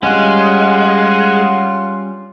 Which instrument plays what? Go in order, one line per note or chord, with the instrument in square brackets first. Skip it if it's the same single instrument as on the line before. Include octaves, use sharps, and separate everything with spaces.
[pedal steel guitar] G3 C#4 [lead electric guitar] G#3 [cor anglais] F4 [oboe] F#5